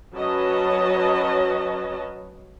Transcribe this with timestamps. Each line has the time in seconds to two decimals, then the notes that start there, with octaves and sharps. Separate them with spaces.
0.15 F#3 C#4 B4 C#5 D#5 A5